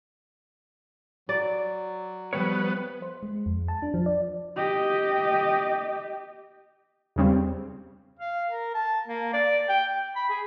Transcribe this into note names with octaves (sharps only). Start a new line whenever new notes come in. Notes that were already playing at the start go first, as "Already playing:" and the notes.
F#3 D5
F3 G3 B3 C#5
C5
G#3
F2
A5
D4
F3
D5
G4 D#5
E2 C#3 G3 C4
F5
A#4
A5
A#3
D5
G5
G5
B5
G#4